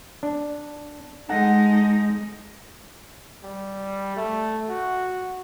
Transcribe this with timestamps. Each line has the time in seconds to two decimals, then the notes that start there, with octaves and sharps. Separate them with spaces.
0.23 D4
1.29 G#3 D#4 A4 F#5 A5
3.44 G3
4.16 A3
4.69 F#4